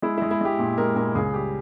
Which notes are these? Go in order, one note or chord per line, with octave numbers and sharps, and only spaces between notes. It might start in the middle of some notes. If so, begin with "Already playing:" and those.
G#3 E4
E4
G#3
E4
G#3 G4
A#2
G#3 A#4
A#2 A#4
C#2 G#4
G3 G4